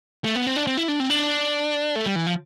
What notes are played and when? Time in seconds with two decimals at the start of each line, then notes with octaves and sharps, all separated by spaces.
0.24 A3
0.36 B3
0.47 C4
0.56 D4
0.67 C4
0.77 E4
0.88 D4
1.00 C4
1.10 D4
1.96 A3
2.06 G3
2.16 E3
2.26 F3